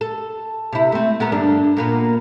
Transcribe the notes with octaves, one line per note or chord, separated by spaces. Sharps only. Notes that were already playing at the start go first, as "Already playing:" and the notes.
A4
C3 E4
A3 C4
B3 A4 A#4
G2 D3 D4
A#2 A#3 B3